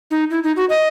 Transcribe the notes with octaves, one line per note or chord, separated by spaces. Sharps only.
D#4
E4
D#4
F#4
D#5